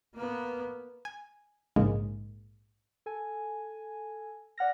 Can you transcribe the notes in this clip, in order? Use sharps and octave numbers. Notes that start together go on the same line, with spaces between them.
A#3 B3
G#5
A#1 G#2 C#3 G#3 A#3
A4 G#5
D5 F#5 F6 A#6